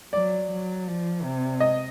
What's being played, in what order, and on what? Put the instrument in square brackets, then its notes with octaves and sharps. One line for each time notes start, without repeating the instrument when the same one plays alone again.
[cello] F#3 [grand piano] D5
[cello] F#3
F3
C3
[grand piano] D#5